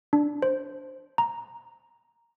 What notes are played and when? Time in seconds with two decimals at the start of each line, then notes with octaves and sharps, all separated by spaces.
0.13 D4
0.42 C5
1.18 A#5